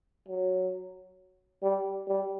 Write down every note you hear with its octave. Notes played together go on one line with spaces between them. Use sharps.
F#3
G3
G3